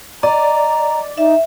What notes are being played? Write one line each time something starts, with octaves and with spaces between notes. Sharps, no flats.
D5 D#5 A#5
D#4 E5